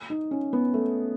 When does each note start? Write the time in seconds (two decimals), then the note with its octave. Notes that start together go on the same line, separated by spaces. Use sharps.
0.10 D#4
0.31 C#4
0.53 B3
0.74 A3